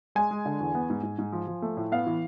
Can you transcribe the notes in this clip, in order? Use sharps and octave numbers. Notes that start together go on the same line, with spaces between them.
G#3 G#5
G#3
D3
E2
B3
G#2
G#2
G#2
F3
F3
A3
A2
B3 F5
E3